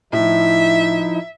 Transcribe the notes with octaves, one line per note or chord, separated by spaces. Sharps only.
A2 F3 D#4 E4 E5